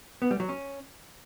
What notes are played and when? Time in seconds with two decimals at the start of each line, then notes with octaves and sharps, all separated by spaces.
0.22 B3
0.31 G3
0.40 F#3
0.49 C#4